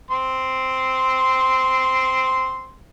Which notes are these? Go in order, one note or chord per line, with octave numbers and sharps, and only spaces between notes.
C4 C6